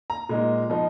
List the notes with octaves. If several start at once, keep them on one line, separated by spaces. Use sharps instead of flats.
A#5
A#2 G#3 D#4
F3 B3 D#4